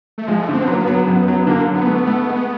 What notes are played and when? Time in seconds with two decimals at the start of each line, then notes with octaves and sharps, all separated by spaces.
0.18 A3
0.27 F3 G#3
0.42 A3
0.48 D3
0.54 C4
0.64 F#3 B3
0.73 A#3
0.82 B3
0.88 F#3
1.07 F#2
1.28 F#3
1.47 D3 A#3
1.68 F#3
1.74 B3
1.87 A3
2.07 A3
2.27 G#3